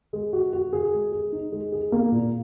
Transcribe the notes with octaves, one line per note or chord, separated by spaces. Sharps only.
G#3
F#4
F#4
G#4
G#3
G#4
D#4
G#3
G#4
A#3
A#2